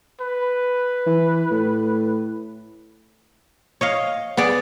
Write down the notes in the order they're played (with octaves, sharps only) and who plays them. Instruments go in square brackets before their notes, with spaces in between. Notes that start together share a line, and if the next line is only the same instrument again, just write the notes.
[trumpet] B4
[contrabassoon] E3
A2
[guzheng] C#5 D#5 F5
B3 G#4 D5